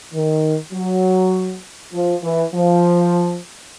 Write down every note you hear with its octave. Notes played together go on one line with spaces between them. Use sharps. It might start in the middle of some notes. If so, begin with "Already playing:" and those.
D#3
F#3
F3
E3
F3